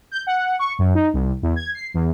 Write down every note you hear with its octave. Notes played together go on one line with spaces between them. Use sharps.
G6
F#5
C#6
F#2
D#4
C2
E2
G#6
C7
E2